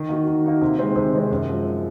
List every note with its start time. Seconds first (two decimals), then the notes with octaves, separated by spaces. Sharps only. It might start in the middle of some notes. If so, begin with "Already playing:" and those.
Already playing: D#3
0.09 A#3 D#4 F#4
0.27 D#3
0.44 A#3 D#4 F#4
0.61 C3
0.79 D#3 G#3 C4
0.96 C3
1.13 D#3 G#3 C4
1.31 F#2
1.49 F3 G#3